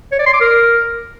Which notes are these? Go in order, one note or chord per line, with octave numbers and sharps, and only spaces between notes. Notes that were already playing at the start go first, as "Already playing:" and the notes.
C#5
D5
C6
D6
A#4